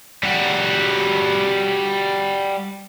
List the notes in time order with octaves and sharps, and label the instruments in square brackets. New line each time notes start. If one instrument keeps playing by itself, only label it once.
[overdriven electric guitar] G3 F#4